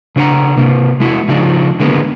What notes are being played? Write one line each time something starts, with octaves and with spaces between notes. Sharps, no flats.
C#3 D4 A#4 F#5 A#5
C3 A#3
G#3 E4 F#4
C#3 F3 G#3 D4 D#4
D3 G#3 A#3 B3